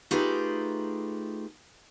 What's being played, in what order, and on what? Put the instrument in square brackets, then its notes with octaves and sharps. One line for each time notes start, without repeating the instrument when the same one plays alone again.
[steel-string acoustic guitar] A3 D#4 F4 G4 G#4 B4